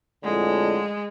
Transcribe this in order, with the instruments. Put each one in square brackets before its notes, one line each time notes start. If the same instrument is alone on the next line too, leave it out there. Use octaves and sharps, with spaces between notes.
[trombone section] F2 A2 D3 [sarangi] G#3